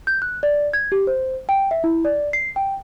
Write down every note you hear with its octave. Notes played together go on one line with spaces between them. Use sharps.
G6
F#6
D5
G#6
G4
C5
G5
E5
E4
D5
C7
G5